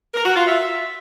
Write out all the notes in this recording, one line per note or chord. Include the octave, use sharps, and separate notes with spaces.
A#4
F#4
F4
E5